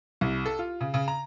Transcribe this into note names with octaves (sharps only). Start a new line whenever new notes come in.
C2
A4
F4
C#3
C#3
A#5